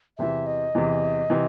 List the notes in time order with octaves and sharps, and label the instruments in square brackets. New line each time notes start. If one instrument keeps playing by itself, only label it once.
[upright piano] E2 C3 E3 [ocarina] E5
[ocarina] D#5
[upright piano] E2 C3 E3
C3 E3